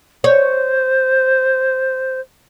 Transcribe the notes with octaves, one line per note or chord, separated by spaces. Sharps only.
C5 C#5